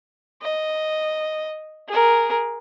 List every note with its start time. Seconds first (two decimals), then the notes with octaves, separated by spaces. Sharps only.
0.41 D#5
1.88 G#4 A#4